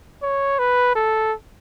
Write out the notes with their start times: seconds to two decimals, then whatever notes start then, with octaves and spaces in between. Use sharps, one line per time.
0.22 C#5
0.59 B4
0.95 A4